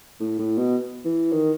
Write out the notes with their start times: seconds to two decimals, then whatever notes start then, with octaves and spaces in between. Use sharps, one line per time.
0.20 A2
0.39 A2
0.57 B2
1.04 E3
1.32 D#3